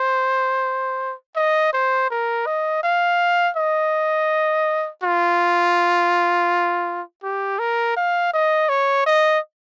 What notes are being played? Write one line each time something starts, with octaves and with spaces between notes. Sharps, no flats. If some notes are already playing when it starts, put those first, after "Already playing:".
Already playing: C5
D#5
C5
A#4
D#5
F5
D#5
F4
G4
A#4
F5
D#5
C#5
D#5